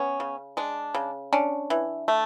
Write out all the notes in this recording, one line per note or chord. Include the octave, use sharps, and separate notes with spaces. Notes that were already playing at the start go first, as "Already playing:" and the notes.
Already playing: B3 C#4
C#3
G#3 D4
C#3
C#4 D4
E3
A3